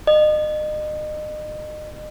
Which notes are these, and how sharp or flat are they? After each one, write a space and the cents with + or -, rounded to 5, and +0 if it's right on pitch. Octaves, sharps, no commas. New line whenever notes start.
D#5 -35